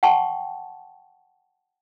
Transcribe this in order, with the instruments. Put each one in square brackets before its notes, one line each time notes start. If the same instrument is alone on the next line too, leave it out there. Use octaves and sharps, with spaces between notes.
[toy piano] F#5 G5 A5 C6 C#6